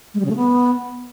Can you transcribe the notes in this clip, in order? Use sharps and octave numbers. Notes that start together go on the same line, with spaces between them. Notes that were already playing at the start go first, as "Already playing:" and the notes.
G#3
G3
C#3
A3
B3